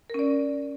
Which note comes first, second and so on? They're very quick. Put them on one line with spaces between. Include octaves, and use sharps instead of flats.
A#4 C#4 D5